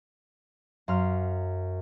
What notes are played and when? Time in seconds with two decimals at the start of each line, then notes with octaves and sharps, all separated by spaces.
0.88 F#2 F5 C6 F6